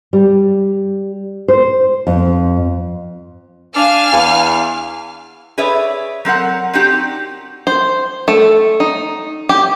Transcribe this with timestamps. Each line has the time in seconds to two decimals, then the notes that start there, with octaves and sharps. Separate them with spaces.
0.13 G3
1.48 C5
2.07 F2
3.76 D4 F5 G#5 F6
4.12 E2
5.58 G#4 B4 C#5 D5 E5
6.25 F#3 C4 A#4 F#5
6.73 C4 D4 D#4 F#4 G4
7.67 C5
8.28 A3
8.80 D#4
9.49 G4